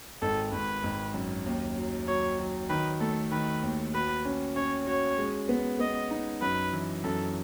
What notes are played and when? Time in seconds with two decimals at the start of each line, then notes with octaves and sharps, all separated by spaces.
0.22 G#1 A4
0.52 G#1 B4
0.84 G#1
1.14 F#2
1.46 D#2
1.77 F#3
2.07 F#3 C#5
2.39 F#3
2.70 D#3 B4
3.00 A3 A4
3.32 D#3 B4
3.63 D#2
3.94 F#4 B4
4.25 C#4
4.56 C#4 C#5
4.86 F#4 C#5
5.18 G#3
5.49 B3
5.79 B3 D#5
6.11 D#4
6.42 F#2 B4
6.73 E3
7.04 F#2 A4